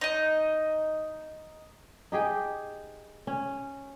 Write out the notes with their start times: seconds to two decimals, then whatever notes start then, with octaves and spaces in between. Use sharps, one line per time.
0.01 D#4 D#5
2.12 D#4 G4 G#4 G5
3.27 C#4